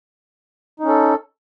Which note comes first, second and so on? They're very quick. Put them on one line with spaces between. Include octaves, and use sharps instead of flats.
D#4 C#4 A4